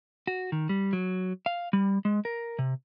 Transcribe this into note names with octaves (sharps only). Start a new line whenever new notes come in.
F#4
D#3
G3
F#3
F5
G3
G#3
A#4
C3